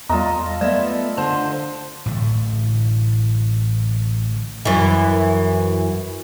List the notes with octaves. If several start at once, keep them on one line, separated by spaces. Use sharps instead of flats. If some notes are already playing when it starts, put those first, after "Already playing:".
E2 G3 F4 A4 D#5 A#5
A3 B3 D5 E5
D3 C5 A5
A1 A2 D3 A3
F#2 E3